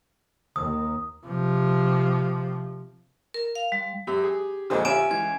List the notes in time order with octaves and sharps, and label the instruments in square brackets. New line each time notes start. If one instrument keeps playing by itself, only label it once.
[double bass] D#2 [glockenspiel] D#6
[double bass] C3 F3
[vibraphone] A#4
F5
G3
[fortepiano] F#2 [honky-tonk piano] G4
[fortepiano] G#4
[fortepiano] F2 A#2 D3 [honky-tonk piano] G#4 C5 D#5
[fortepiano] C#4 F4 C#5 [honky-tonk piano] G4 E5 [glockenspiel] G#5 D7 E7
[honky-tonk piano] C#2 E3 [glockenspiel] G#6